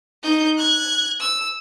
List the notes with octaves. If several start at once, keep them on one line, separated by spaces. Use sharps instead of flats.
D#4 G6
F#6 G#6
E6